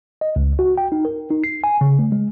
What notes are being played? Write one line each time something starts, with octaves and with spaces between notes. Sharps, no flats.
D#5
C#2
F#4
G5
D#4
A#4
D#4
C7
G#5
C#3
A3
G#3